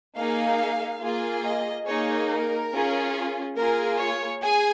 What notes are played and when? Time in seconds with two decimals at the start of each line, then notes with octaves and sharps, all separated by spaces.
0.15 A#3 D#4 G#4 F5
1.01 A#3 F4 G#4
1.44 D#5
1.86 A#3 D#4 G#4 C#5
2.30 A#4
2.73 C#4 F4 G#4
3.57 A#3 F4 G#4 A#4
4.00 C#5
4.42 G#4 G#5